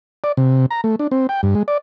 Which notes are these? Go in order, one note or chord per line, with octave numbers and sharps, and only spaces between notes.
D5
C3
A#5
A3
D4
C4
G5
G2
G#3
D5